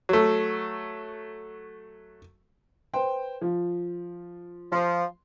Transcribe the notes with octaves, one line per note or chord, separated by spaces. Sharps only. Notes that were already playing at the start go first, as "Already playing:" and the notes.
F#3 A3
B4 C5 G5
F3 F4
F3 C6